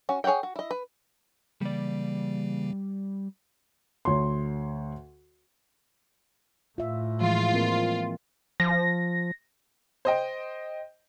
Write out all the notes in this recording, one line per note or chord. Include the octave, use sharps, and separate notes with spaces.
C#4 F#4
G#4 C#5 E5 F#5 G5
F#4
E4 D#5
B4
C#3 E3 G3 A#3 D5
D2 C#5 C6
A2 F4 E5
E3 F3 G#3 F4
A#3 C4 A#4
F3 A#6
C5 D#5 G5